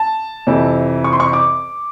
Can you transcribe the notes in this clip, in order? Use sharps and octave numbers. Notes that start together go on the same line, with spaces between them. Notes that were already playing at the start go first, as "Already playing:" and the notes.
Already playing: A5
F2 C3 E3
C#6
C6
C#6
D6